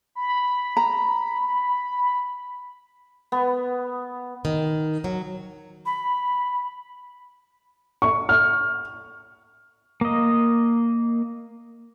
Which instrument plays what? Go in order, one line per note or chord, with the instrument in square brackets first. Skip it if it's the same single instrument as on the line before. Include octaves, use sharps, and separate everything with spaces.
[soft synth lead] B5
[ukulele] A#5
[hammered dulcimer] B3
[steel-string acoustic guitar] D#3
F#3
[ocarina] B5
[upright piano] C#6
F6
[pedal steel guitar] A#3 D#5